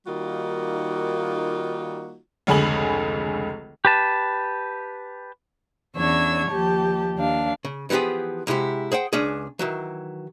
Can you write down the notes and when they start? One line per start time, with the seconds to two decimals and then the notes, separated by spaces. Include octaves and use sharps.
0.06 D#3 G3 A#3 D#4 F4 F#4
2.47 F1 C#2 D3 G#4 B5 F#7
3.85 G4 B4 A5
5.96 E2 C#4 D4 C#5 E6 G#6
6.50 D#2 F3 G4 A5
7.17 D#2 D4 F5
7.65 C#3
7.90 E3 F3 B3 G4 G#4
8.47 C3 G#3 E4 F#4 G4
8.92 G#4 C5 F#5 G5
9.13 C#2 C#4 D4 G#4
9.59 D#3 E3 F#3